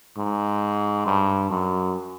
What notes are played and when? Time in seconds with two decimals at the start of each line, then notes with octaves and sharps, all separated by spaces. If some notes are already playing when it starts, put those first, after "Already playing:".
0.18 G#2
1.06 G2
1.50 F#2